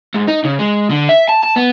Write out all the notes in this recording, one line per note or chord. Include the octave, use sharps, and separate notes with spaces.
G#2
D#4
C#3
G#3
D3
E5
A5
A5
B3